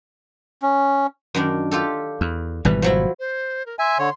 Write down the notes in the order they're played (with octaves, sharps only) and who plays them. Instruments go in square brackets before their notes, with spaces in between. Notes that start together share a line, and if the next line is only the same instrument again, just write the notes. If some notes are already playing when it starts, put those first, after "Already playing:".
[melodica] C#4
[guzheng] F#2 D#3 D4
F4 G4 A4
[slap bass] E2
[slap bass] G#1 B2 G3 [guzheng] E3
[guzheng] F3 F#3 E4
[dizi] C5
A#4
[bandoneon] E5 G#5 [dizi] C6
[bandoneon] D3 C#5